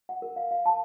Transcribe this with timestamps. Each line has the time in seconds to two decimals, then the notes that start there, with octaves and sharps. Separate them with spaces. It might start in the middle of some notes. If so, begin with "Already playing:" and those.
0.09 F#5
0.22 A#4
0.36 F5
0.51 F5
0.66 A5